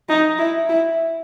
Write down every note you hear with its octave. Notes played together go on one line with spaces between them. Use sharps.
D#4
E4
E4